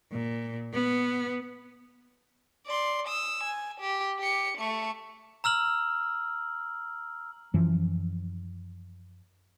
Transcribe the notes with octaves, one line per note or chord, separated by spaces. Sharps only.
A#2
B3
D5 C6
D#6 E6
G#5
G4
G4 C#7
A3 C#6
A#5 E6 F6 F#7
F#2 E3 F3